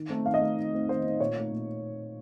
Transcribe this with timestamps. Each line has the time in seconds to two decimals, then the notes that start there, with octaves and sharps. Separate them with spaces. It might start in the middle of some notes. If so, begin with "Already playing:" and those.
Already playing: D#3
0.10 A3 C4 D#4
0.26 D#3 F5
0.34 D#5
0.41 A3 C4 D#4 F5
0.57 D#3
0.73 A3 C4 D#4
0.89 D#3 C5
1.04 A3 C4 D#4
1.20 A#2 C#5
1.36 A3 D#4
1.52 A#2